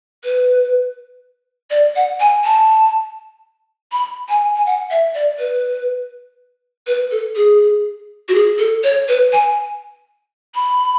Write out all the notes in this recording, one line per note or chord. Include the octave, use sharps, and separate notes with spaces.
B4
D5
F#5
G#5
A5
B5
G#5
G#5
F#5
E5
D5
B4
B4
A4
G#4
F#4
G#4
A4
C#5
B4
G#5
B5